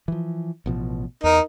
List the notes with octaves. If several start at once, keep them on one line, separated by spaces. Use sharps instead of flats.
E3 F3
A1 B2 F3
E2 D#4 A#4